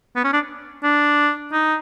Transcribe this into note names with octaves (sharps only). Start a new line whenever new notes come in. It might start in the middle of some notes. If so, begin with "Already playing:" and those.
B3
C#4
D4
D4
D#4